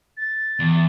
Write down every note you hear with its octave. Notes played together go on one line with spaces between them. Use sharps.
A6
E2